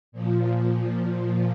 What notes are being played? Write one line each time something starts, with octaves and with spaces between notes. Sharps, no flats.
A#2 F3